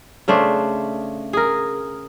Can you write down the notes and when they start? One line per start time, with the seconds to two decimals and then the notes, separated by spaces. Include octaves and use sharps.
0.28 C#3 A3 D4 C5
1.33 G#4 A#4